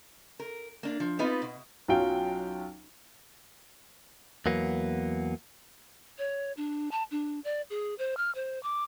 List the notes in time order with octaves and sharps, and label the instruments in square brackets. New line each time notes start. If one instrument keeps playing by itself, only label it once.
[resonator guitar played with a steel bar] A#4
A#3 D4
F3
B3 C4 D#4 F4 B4
B2
[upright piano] B1 F#3 C#4 F4 F#4 G5
[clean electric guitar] E2 F#3 A#3 B3
[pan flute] C#5
D4
A5
D4
D5
G#4
C5
F6
C5
D6